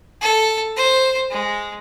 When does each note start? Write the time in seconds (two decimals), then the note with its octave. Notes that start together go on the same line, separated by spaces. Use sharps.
0.21 A4
0.76 C5
1.31 G#3